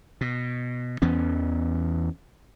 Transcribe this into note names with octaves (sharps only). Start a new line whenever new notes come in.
B2
E2 E3 B3 C#4